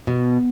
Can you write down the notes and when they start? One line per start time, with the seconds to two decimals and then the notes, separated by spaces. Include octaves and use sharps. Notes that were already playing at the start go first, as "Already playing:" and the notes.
0.07 B2